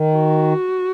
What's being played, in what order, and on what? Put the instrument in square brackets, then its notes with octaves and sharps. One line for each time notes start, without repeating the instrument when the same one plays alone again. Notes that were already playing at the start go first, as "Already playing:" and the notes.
Already playing: [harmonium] D#3
[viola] F#4